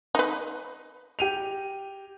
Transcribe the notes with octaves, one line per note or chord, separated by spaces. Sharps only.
D#4 B4
G4 D#7 F7